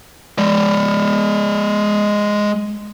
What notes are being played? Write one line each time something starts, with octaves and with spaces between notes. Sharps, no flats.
G#3 D5